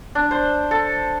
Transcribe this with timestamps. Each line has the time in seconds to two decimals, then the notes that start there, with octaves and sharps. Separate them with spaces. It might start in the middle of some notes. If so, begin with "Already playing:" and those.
0.15 D4
0.31 C5
0.71 A4